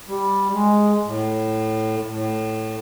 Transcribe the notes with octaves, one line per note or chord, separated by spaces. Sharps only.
G3
G#3
A2
A2